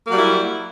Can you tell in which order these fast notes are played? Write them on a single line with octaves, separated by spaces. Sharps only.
A#3 F#3 G3 E4